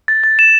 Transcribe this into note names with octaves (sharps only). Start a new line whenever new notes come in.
A6
A6
E7